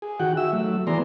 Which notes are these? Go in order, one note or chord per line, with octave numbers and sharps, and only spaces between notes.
G#4
D#3 F#4 F#5 G5
F#4 E5 E6
F#3 A3
E3 B3 G#4 D5 A#5 C6